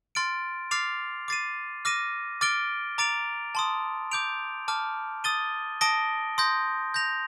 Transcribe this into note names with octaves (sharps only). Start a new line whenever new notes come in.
C6 F6 A6 D7
D6 F6 A6 C7 F7
D6 A6 C7 D#7
D6 F6 A#6 D#7
D6 F6 A6 D7 G7
A#5 D6 A6 D7 F7
A5 C6 D#6
D6 G6 D7 F7
A5 D6 F6
D#6 A6 D#7 G7
A5 D#6 A#6 D7 G7
C6 D#6 G6 A#6
G6 A#6 F7